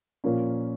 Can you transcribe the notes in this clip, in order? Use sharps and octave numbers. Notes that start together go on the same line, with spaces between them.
A#2 F3 A#3 C#4